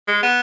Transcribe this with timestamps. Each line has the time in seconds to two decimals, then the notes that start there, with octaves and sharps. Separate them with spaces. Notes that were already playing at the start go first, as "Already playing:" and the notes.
0.08 G#3
0.23 B3